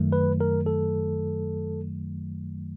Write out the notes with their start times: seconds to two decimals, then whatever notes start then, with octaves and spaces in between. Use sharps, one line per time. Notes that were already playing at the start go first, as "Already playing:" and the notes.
Already playing: F#2 D#3 F#3 A3
0.12 B4
0.41 A#4
0.66 A4